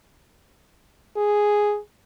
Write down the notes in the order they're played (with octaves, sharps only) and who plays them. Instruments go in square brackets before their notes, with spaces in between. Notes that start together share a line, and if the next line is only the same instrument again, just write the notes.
[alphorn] G#4